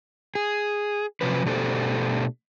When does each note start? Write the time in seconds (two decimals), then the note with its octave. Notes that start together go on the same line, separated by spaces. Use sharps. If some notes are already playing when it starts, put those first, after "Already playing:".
0.35 G#4
1.21 C3 F3 F#3 C#4 B4
1.45 B2 A3 D4 G4 A4 C5